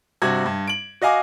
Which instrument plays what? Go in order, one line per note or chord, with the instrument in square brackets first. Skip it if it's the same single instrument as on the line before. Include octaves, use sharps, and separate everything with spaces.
[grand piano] G2 C3 F#4 G#6
G2
D7 F#7
F#4 D#5 F5 G#5 D6